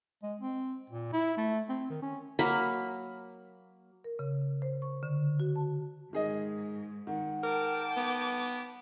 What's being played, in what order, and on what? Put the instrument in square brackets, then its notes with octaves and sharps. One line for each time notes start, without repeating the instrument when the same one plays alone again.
[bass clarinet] G#3
C4
A#2
E4
A3
C4
D#3
C#4
[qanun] F#3 A#3 B5
[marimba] A#4
C#3
C5
C#6
D3
F#4
A5
[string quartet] G#2 [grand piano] D#3 G#4 D#5
[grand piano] D#3 [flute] F#5
[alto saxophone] A#4 [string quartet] G5 A5 D6
[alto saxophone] B3